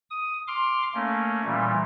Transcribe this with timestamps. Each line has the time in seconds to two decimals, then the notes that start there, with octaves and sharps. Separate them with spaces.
0.10 D#6
0.48 C6 D6 F6
0.94 A3 A#3 C#4
1.45 A#2 E3 G3